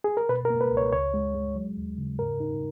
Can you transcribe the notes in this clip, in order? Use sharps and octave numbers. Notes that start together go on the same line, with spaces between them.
G#4
A#4
B2 B4
A#4
A#3
B4
C#2
C#5
C#2 C#5
G#3
G#3
F#3
D#2
C#3
G#2 A#4
D#4